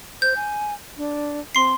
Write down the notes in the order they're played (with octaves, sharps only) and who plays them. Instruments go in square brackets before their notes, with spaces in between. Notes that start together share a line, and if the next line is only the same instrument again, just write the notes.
[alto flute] C5 [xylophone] G6
[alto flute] G#5
D4
[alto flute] C4 [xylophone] C6 C7